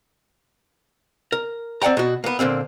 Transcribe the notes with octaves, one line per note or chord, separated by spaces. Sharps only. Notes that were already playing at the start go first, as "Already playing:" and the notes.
A#4
C4 D5 F#5 G5 A#5
B2 F#4
A#3 B3
A#2 D3 A#3 C4